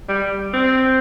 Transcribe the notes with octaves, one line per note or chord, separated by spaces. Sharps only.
G3
C4